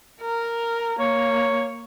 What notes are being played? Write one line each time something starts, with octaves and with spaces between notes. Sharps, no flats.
A#4
A#3 C#5